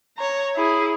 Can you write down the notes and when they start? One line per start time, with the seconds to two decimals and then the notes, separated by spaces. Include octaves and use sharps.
0.18 C#5 A#5
0.56 E4 G#4